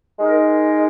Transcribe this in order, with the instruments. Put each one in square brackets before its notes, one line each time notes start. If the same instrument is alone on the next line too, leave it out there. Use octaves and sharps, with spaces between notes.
[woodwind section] G#3 D#4 A#4